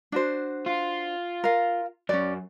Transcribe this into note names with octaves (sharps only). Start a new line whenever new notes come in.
D4 F#4 C5
F4
A#4 F5
F#2 C#4 D5